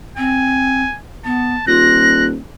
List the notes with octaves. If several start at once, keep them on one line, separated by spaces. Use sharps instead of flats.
C4 G#5
B3 A5
D#1 F4 F#6 A#6